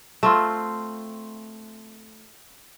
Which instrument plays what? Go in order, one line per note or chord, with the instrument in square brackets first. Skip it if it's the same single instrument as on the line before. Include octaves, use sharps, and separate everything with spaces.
[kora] A3 C4 F4